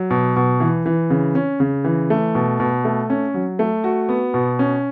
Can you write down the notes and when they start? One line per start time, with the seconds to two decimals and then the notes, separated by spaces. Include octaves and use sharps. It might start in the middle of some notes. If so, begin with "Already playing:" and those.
Already playing: F#3
0.10 B2
0.36 B2
0.60 E3
0.86 E3
1.10 C#3
1.35 C#4
1.60 C#3
1.84 E3
2.10 A3
2.35 B2
2.60 B2
2.85 A3
3.10 C#4
3.34 F#3
3.59 A3
3.84 F#4
4.09 B3
4.34 B2
4.59 C#4